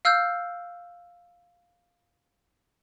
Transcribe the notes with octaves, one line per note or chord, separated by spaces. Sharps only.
F5 E6 F6 G6